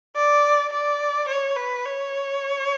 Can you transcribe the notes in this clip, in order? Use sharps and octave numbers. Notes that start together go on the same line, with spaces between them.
D5
D5
C#5
B4
C#5